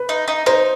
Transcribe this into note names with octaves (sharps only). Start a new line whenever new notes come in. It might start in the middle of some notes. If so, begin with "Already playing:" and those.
Already playing: B4
D#4
D#4
D#4 C5